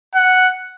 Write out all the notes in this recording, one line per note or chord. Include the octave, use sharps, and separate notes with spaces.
F#5